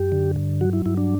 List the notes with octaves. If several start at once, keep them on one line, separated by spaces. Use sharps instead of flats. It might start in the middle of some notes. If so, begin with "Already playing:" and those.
Already playing: F#2 G4
D3
G2
F#3 F#4
E4
G2 E4
D4